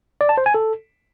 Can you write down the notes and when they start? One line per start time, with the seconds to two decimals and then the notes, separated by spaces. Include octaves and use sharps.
0.21 D5
0.29 A5
0.38 C5
0.46 G#5
0.54 A4